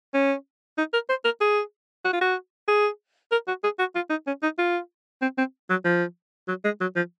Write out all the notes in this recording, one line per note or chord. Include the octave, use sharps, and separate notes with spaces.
C#4
D#4
A#4
C5
A#4
G#4
F#4
F4
F#4
G#4
A#4
F#4
G#4
F#4
F4
D#4
C#4
D#4
F4
C4
C4
F#3
F3
F#3
G#3
F#3
F3